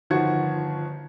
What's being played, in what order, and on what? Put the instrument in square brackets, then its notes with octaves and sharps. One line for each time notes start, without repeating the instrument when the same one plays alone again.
[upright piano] G1 D#3 F3 F#4 G#6 C#7